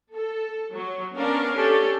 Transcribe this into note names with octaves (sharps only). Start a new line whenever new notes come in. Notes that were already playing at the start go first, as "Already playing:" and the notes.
A4
F#3
B3 C#4 D4 A#4 F5
C#4 D4 G4 A4